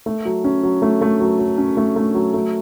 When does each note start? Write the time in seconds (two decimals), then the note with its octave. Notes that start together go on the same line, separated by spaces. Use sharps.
0.06 A3
0.25 F#3
0.44 C#4
0.63 F#3
0.82 A3
1.01 A3
1.20 F#3
1.39 F#3
1.58 C#4
1.77 A3
1.96 A3
2.14 F#3
2.34 A3